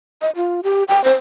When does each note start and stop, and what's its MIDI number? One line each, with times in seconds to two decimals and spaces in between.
0.22 0.30 75
0.36 0.61 65
0.63 0.84 67
0.88 1.04 79
1.04 1.13 72